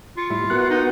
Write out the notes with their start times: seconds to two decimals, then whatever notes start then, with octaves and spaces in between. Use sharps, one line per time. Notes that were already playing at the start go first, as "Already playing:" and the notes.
0.17 F4 C#6
0.30 A2 G3 E4
0.50 B3 F#4 A#4 F#5
0.70 D#4